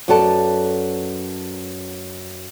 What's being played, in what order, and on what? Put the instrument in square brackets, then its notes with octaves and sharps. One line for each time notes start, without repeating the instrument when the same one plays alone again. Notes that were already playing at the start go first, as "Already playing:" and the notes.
[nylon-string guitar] F#2 B3 F#4 A4 D5 A5